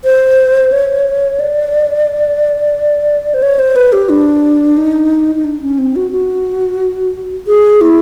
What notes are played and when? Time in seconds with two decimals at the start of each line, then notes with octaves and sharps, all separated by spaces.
0.04 C5
0.72 C#5
1.40 D5
3.34 C5
3.43 C#5
3.59 C5
3.76 B4
3.93 G4
4.09 D4
4.77 D#4
5.35 D#4
5.44 D4
5.62 C#4
5.78 C4
5.96 F#4
6.12 F#4
7.47 G#4
7.81 E4